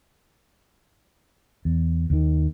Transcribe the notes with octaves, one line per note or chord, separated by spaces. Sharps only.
E2
D#2 D#3